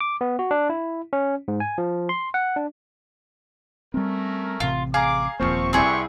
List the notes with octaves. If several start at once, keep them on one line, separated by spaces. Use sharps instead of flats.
D6
B3
F#4
D4
E4
C#4
G#2
G#5
F3
C6
F#5
D4
G3 A3 C4 C#4 A#4
A1 C3 F4
G#4 F5 A#5 D6
D#1 C#2 F3 A#3 C4 C5 F5 C#6
C2 C4 E4 G4 G#4 B4 D5 C#6